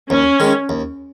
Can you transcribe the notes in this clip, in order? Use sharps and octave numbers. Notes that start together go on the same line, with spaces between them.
D#2 C#4
D#3 G#3
D#2